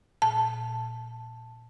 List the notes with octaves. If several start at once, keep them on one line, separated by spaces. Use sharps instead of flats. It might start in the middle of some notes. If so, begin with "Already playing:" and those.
A#2 A5